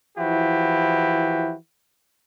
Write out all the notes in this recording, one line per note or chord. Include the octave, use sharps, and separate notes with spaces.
E3 F3 E4 F#4 G4